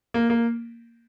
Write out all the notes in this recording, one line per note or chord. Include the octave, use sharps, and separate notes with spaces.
A#3
A#3